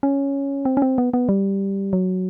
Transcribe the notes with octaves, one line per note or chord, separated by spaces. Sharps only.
C#4
C4
C#4
C4
B3
B3
G3
F#3